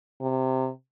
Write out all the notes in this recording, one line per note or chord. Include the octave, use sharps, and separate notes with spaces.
C3